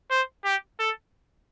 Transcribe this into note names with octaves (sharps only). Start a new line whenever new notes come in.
C5
G4
A4